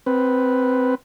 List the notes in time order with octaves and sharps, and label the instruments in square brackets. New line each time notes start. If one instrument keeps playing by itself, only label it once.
[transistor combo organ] C4 B4